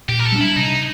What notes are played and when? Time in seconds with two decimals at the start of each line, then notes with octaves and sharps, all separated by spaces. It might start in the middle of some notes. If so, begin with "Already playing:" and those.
0.08 A#2 G4
0.19 A#4
0.25 A4
0.32 G3 B3 D4
0.41 E4
0.56 C3 D#4